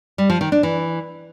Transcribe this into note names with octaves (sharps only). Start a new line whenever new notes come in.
G3
F3
D#3
D4
E3